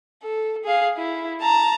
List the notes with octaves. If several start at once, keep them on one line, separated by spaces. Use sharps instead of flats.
A4
G#4 F5
E4
A5 A#5